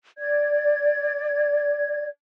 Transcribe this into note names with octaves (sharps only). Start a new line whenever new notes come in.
D5 G#6